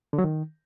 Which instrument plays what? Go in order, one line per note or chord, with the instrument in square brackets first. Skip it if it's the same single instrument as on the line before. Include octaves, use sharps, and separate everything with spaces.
[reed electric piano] D3
F#3
D#3